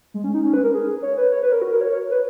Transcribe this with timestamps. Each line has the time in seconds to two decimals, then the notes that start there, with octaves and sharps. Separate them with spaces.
0.14 G#3
0.24 C#4
0.34 D#4
0.44 C#4
0.53 B4
0.63 A#4
0.74 G#4
1.02 C#5
1.17 B4
1.32 C#5
1.42 B4
1.52 A#4
1.62 F#4
1.72 A#4
1.81 C#5
1.91 C#5
2.11 B4